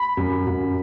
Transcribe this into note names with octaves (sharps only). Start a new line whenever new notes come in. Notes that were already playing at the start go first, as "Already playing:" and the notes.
Already playing: B5
F#2
F#2